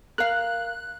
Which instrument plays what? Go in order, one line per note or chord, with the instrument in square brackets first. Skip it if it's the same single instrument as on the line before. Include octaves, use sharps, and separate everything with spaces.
[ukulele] A#4 F5 [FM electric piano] F#6